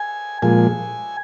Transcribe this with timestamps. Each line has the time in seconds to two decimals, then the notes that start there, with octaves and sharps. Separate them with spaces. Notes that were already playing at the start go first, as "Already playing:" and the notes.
Already playing: G#5
0.42 A#2 F3 G#3 G#5